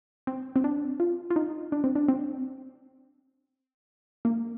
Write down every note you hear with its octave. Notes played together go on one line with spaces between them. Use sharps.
C4
C4
D4
F4
F4
D#4
D4
C4
D4
C4
A#3